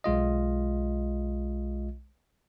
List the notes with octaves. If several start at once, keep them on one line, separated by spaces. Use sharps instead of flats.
B1 G#3 F4 D#5